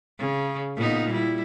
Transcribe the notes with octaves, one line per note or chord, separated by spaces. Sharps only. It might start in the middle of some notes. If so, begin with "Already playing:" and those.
C#3
A#2 B3 D#4
G3 E4